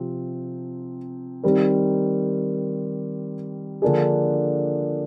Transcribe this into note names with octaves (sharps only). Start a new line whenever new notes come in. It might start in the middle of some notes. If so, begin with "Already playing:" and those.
Already playing: C3 F3 C4 G4
D#3 G3 C4 G4 A#4
D3 F3 A#3 D4 G#4